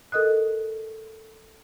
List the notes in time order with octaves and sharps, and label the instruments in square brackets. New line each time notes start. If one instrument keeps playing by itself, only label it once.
[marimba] A4 A#4 D#5 D#6 F#6